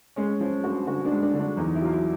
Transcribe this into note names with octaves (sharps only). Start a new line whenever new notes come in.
G#3 C#4
F3 C#4
G2 F#4
D3 F#4
D4
G#3
D4
D3
D4
E2 D#4
E4
F#3 F4
E4